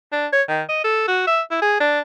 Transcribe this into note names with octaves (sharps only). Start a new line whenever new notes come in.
D4
C#5
D#3
D#5
A4
F#4
E5
E4
G#4
D4